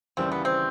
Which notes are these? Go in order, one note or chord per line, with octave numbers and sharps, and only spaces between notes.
D#2 C#3 E3 G3 C4
B3
C4